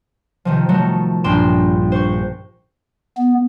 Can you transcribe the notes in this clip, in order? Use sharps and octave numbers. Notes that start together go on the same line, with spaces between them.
C3 D#3 F3
D#3 F3 F#3 A3
A#1 G2 A#2 G5 C6 E7
C5 C#6
B3